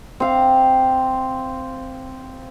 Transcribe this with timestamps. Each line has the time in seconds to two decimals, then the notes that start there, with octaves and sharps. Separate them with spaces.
0.20 C4 F5 D6